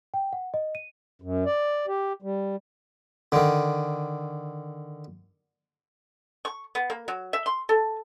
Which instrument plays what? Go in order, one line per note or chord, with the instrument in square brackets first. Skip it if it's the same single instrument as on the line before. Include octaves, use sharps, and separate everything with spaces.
[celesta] G5
F#5
D#5
D#7
[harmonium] F#2
D5
G4
G3
[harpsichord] D3 D#3
[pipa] C#6
B3
A#3
F#3
E5
C6
A4